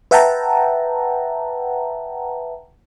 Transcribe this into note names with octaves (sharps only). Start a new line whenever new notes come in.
B4 E5 F#5 G5 A5 A#5